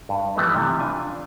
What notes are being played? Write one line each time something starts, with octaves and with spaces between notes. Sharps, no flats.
G2
E3 F3 G3 A3 B3 D#4
C3 E3
D4 F4 G#5